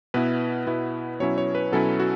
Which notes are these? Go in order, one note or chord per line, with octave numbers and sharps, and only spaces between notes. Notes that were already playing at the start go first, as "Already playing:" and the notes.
B2 B3 E4 B4
B2 B3 E4
B2 F#3 C#4 E4 C#5
C#5
B4
B2 F#3 C#4 E4 A4
F#4